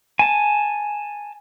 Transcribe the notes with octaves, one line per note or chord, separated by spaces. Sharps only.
G#5 A5